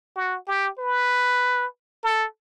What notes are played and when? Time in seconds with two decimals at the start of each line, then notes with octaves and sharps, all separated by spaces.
0.16 F#4
0.47 G4
0.78 B4
2.03 A4